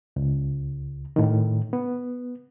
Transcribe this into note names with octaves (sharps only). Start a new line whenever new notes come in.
C#2
A2 D#3
B3